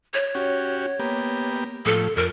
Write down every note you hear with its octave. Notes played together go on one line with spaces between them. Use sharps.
C#5
C#4 F#4 G4
A#3 B3 G4
A2 F3 A4
F2 A#4